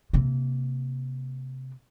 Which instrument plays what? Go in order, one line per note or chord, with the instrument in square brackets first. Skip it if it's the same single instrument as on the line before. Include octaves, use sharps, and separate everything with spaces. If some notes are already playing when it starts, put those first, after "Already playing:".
[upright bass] C3 A#3